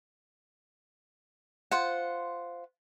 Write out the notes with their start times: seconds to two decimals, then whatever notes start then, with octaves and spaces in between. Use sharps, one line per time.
1.71 F4 C5 F#5